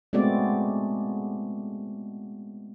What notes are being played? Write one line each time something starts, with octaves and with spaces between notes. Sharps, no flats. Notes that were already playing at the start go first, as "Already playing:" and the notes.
G#3 A3 B3 C4 F#4 D5